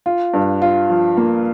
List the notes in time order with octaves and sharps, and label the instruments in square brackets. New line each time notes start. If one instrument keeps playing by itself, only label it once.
[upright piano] F4
G2
F4
F3
A#3